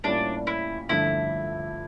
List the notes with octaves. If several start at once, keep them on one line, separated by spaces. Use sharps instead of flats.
A2 G3 A#3 C#4 D4 F4
E4
G2 D3 F3 A3 E4